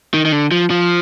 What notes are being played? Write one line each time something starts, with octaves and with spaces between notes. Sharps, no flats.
D#3
D#3
D3
F3
F3